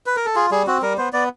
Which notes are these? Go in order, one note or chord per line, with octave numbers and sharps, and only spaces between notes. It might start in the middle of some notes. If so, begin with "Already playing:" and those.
B4
A#4
A4
F4 G#4
G3 G#4
C4 F#4
G3 A#4
B3 C5
B3 D5